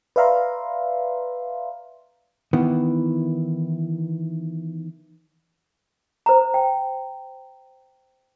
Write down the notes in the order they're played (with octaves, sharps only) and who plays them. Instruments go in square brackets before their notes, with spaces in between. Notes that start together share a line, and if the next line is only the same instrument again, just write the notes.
[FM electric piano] B4 D5 E5 F5 A#5 C6
[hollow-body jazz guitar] D#3 E3 B3 E4
[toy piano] C5 A#5
G5